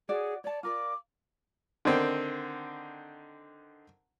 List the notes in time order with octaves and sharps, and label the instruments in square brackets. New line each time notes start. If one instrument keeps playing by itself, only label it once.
[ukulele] F#4 C#5 D5 [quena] G#4
[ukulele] C#5 A5 [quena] D5
[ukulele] F4 A#4 D5 [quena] D6
[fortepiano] D3 D#3 C4